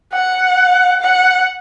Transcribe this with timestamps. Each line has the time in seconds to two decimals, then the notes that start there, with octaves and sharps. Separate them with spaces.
0.13 F#5
1.01 F#5